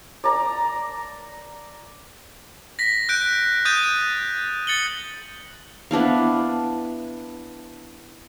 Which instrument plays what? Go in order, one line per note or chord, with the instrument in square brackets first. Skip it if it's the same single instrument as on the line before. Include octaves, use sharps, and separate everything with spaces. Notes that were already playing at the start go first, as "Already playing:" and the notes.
[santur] D5 A#5
[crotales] A#6 B6
F#6 G6 D7
D#6 G6 A6 D#7
A6 C#7 F#7 G7
[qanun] B3 D4 E4 F5